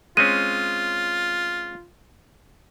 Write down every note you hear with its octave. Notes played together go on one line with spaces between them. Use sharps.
G#3 C4 C#4 F4 D#7